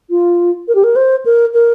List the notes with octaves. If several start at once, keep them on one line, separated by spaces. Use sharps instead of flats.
F4
A#4
G4
A#4
C5
A#4
A#4